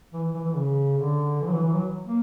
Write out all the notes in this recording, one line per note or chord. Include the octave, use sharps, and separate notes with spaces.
E3
E3
E3
C#3
D3
E3
F#3
E3
E3
F#3
A#3